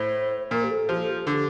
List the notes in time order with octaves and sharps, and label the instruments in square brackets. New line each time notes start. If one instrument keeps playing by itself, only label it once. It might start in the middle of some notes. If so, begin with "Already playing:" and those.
Already playing: [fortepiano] A2 [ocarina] C5
[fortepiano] A#2 [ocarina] A#4
[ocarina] G4
A4
[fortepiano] F3 [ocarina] G4
[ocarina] A4
G4
[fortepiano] D3